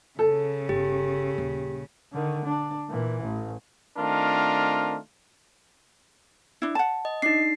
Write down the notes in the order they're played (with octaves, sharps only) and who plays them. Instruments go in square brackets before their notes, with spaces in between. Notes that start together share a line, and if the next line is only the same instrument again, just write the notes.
[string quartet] C#3 [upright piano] A4
[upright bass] G1 [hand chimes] G4
[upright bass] D#1
[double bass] D3 D#3
D4
A#2 E3
A1
[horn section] D#3 A3 C4 D4 F4 A#4
[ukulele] D4 E4
F#5 A5
[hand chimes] D#5
[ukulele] D4 [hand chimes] D#4 C7